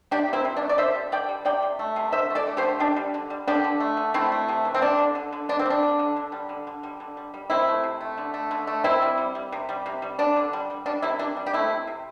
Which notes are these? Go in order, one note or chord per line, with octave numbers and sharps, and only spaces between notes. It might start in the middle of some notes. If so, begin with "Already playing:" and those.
C3 D4 G4
C3 C4 E4
C3
D4
A3
D5
D3 C5 E5
G3
D3 D5 G5
G3
C3 D5 G5
C3
A3
C3
D3 C5 E5
A3
A4 D5
A3
G4 C5
D3
D3 D4 G4
G3
D3
G3
D3 D4 G4
D3
A3
D3
A3 C4 E4
A3
C3
E3
C4
G3 D4
D3
D3
D3
D3 D4
C4
G3 D4
D3
D3
D3
G3
D3
D3
G3
D3
G3
G3
C3 C4 E4
A3
C3
A3
D3
A3
D3
A3
C3 C4 E4
G3
G3
G3
C3
G3
C3
G3
G3 D4
D3
G3
G3
G3 D4
C3 C4 E4
C3 D4
G3
G4
A3 C4 E4
C3
C3